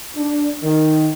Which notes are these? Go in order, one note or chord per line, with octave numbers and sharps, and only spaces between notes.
D4
D#3